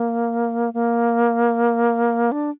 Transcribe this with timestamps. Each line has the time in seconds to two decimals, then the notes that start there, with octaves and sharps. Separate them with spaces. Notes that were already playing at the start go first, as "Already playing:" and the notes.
Already playing: A#3
0.74 A#3
2.32 D4